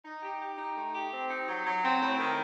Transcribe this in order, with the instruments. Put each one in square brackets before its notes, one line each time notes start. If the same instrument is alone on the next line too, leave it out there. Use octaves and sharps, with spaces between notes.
[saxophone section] D#4
G4
G4
D#4
A3
G4
C4
D#4
F#3
F#3
C4
A2
D#3